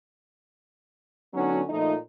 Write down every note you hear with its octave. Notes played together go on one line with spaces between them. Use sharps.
D3 F#3 B3 C#4 D#4 F#4
A#2 F3 A3 D#4